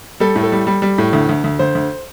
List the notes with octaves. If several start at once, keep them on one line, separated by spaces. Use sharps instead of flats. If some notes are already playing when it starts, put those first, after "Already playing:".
G3 A4
A2
A4
G3
G3
G3
A2
D2
D2
D2
D2 C5
D2